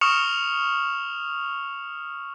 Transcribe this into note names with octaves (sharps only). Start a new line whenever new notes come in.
C#6 D#6 F6 C#7 E7 F7